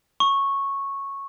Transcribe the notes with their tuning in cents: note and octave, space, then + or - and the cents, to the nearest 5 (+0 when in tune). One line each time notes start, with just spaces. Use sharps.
C#6 -10